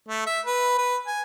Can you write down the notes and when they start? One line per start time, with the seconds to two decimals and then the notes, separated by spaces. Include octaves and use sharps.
0.09 A3
0.27 E5
0.45 B4
0.78 B4
1.07 G#5